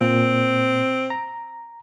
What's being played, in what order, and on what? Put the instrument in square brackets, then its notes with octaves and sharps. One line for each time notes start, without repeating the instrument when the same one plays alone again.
[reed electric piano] A#2 [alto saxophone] C4
[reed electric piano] A#5